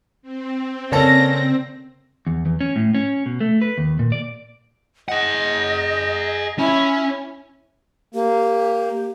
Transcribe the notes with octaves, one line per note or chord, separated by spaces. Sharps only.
C4
C#3 A#3 C#4 A4 D5 A#6
E2
E2
C#4
A2
C#4
B2
A3
B4
D#2
A#2
D5
G#4 D#5 F#5
C#4 E4
A#3 G4